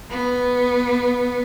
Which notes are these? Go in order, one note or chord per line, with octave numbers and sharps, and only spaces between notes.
B3